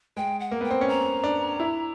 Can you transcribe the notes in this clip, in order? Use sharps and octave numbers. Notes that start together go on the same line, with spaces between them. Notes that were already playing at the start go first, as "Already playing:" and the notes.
G#3 G5
F#5
A#3
B3 G5
C4
C#4
C4 A#5
D4
E4